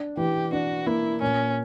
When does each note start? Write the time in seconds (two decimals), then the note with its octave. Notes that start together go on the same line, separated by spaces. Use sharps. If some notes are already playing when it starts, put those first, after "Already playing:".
Already playing: D4
0.17 E3 G4
0.52 D4 F#4
0.87 A#3 E4
1.22 A#2 C#4